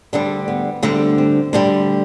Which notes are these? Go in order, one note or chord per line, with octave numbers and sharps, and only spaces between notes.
D2 D3 G3 D4
B3
D2 D3 G3 C4
C4
D2 D3 G3 D4